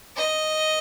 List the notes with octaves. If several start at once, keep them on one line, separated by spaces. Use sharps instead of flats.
D#5